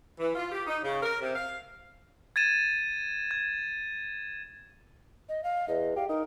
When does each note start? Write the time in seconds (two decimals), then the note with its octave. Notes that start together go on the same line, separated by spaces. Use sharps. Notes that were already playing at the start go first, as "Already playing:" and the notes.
0.19 E3
0.35 F4
0.51 G4
0.67 D#4
0.83 C#3
1.03 A#4
1.20 C3
1.35 F5
2.36 G#6 A6 D#7 E7
3.31 G#6
5.29 D#5
5.44 F5
5.68 E2 D#5
5.96 G4 F5
6.09 D#4 A#4